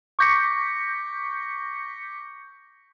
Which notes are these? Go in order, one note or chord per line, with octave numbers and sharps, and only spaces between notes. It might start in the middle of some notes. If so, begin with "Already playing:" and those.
C#6 D6 G6 A#6 B6 C#7